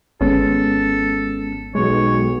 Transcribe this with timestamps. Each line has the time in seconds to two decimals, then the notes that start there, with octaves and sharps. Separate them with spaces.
0.21 G#1 G#3 B3 C#4 A4
1.75 B1 G#3 C#5